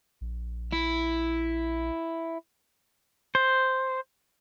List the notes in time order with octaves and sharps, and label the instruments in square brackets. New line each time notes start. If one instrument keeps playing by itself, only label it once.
[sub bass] A#1
[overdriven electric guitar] E4
[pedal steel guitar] C5